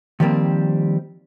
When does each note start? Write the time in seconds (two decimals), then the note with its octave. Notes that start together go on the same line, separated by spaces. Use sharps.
0.20 D#3 F3 G3 A#3 C4